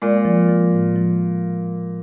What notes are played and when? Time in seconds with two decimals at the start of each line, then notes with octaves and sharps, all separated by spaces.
0.02 A#2 G#3
0.25 F3
0.49 F3
0.72 A2
0.96 F3